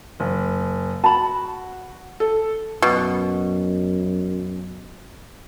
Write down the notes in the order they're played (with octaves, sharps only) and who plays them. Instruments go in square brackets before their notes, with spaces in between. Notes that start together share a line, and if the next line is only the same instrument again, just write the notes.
[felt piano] F#1
[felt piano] F#4 [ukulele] A5 B5
[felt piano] A4
[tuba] F#2 [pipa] B2